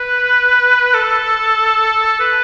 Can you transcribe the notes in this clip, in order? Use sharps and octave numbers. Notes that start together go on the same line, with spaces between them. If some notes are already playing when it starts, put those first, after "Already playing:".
Already playing: B4
A4
B4